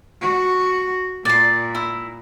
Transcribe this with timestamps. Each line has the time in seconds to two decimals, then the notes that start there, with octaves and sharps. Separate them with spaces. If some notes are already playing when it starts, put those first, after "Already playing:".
0.22 F#4
1.25 A#2 D5 C6
1.75 E4